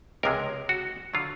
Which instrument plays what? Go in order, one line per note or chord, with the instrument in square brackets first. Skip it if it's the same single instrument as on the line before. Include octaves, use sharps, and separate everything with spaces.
[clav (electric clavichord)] C#2 C3 F3 G#3 A#4
F#4
D3 F#3 F4